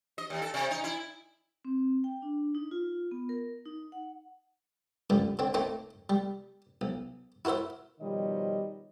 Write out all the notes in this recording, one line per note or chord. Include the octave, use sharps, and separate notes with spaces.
D#5
D#2
A4
C3
D#4
E4
C4
G5
D4
D#4
F4
B3
A#4
D#4
F#5
C#2 F#2 D3 G3
D3 C4
A3 A#3 C4 D#4
G3
B1
E4 F#4 A#4 C5 E5
B2 D#3 F3 G3 C#5 D#5